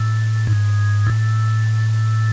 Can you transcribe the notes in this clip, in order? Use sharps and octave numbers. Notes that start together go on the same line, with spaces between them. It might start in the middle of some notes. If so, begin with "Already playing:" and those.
Already playing: A2
G#2
A2